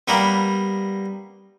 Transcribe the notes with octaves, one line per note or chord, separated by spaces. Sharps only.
G3 A#3 B3